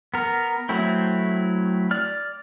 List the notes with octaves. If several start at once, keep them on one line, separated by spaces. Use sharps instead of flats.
B3 A#4
F#3 A3 C4 E4
D5 F6